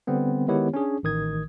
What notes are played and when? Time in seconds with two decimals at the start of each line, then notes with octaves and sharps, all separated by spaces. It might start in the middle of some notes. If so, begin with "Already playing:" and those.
0.07 D3 G3 B3 C4
0.48 D#3 G#3 B3 E4 G4 C#5
0.73 C#4 D4 G#4
1.03 A1 D#3 D#6 G#6